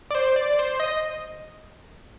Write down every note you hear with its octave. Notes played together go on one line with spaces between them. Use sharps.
D5
C5
D5
C5
D#5